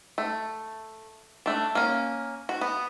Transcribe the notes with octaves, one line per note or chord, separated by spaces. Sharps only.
A3
A3 D4
A#3 C#4
F#4
B3